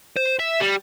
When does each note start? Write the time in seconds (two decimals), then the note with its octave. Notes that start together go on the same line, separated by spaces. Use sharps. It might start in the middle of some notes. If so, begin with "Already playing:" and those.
0.16 C5
0.39 E5
0.60 G3